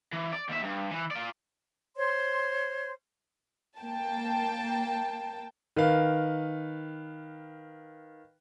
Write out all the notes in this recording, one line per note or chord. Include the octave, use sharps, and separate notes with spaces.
E3
D5
D#2 E5
G2
E3
F4 D5
C5 C#5 C6
A#3 G5 A5
D#3 B4 F5